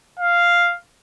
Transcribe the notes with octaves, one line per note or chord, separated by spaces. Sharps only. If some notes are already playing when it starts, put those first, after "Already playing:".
F5